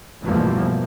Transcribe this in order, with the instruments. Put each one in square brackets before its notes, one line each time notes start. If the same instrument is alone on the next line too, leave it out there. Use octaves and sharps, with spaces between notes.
[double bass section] E2 G2 B2 F3 A3 A#3